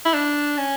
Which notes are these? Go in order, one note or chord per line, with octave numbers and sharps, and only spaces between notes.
E4
D4
C#4